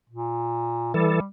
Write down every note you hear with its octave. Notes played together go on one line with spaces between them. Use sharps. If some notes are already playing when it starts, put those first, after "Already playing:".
A#2
E3 G3 A4